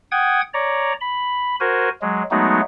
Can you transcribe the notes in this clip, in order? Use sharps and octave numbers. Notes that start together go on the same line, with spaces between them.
F#5 G5 D#6 G#6
C#5 D5 A#5
B5
F#4 A#4 C5 G#5
F#3 G#3
F#3 G#3 A3 B3 D#4 F#4